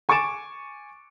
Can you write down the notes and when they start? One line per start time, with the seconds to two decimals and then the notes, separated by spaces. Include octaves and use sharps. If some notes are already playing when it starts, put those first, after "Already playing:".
0.09 G#5 C#6 D6 A6 D7 E7